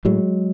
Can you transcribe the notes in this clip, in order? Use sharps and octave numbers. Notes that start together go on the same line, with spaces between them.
A2 F#3 G#3